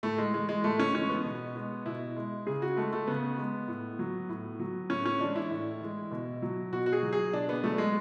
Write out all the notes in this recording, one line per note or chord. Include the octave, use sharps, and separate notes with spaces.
A2 A3
G#3
E3 G#3
G#3
A2 A3
C#4
E3 G#3 C#4
B3
B2
G#3
B2 E4
G#3
C#3 G#4
F#4
G#3 A3
A3
C#3 B3
G#3
A2
F#3
A2
F#3
A2 C#4
C#4
E3 G#3 D4
E4
A2
E3 G#3
B2
F#3
B2 F#4
F#4
G#4
F#3
G#4
B2 D4
B3
F#3 A3
G#3